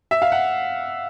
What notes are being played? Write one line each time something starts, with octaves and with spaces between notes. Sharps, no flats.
E5
F5
F#5